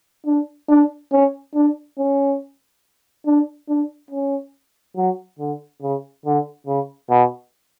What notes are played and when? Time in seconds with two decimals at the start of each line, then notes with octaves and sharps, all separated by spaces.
0.26 D4
0.69 D4
1.12 C#4
1.55 D4
1.98 C#4
3.26 D4
3.69 D4
4.11 C#4
4.96 F#3
5.39 D3
5.82 C#3
6.25 D3
6.67 C#3
7.10 B2